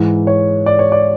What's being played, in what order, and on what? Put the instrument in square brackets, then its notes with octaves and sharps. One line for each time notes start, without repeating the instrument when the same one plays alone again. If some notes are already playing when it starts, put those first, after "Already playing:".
Already playing: [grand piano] G#2 E3
C#5
D5
C#5
D5